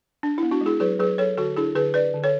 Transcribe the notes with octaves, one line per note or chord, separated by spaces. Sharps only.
D4
B3 E4
D4 F#4
G#3
E4 G#4
F#3 G#4 B4
F#3 G#4 B4
F#3 A4 C#5
D3 F#4 A4
D4 E4 G#4
D3 G#4 B4
D4 B4 D5
D3
A4 C#5